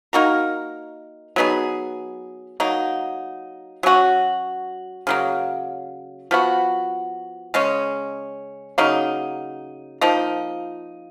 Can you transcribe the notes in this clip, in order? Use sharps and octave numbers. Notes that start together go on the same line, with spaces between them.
A#3 D#4 F#4 A#4
F#3 B3 D#4 G#4
F#3 A#3 D#4
F#3 C#4 F#4
C#3 F#3 A#3
F3 B3 F#4
C#3 G#3 C#4
C#3 F#3 A#3 D#4
F3 A#3 D#4